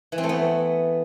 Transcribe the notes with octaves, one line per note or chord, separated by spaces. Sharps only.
E3
C4
A3
B3